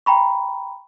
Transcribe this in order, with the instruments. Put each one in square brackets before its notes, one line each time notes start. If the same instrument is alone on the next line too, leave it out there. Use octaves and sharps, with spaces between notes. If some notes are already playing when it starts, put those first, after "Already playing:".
[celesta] G5 A#5 B5 C#6